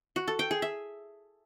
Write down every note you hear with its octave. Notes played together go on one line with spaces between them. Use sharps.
F#4
A4
G5
G#4
E5